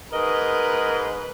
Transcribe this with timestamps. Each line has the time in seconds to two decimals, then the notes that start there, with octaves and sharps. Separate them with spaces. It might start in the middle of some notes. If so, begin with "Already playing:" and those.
0.13 G#2 A#4 B4 D#5